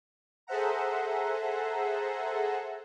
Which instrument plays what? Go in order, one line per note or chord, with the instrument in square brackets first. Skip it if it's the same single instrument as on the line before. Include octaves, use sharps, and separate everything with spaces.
[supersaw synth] G#4 A4 C5 E5 F#5 A#5